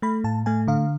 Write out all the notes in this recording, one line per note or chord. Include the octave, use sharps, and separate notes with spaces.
A3 B5
A2 A5
A3 G#5
D3 F5